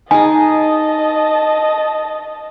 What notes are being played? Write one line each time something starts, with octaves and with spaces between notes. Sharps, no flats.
D#4 G#4 D#5 G#5 A5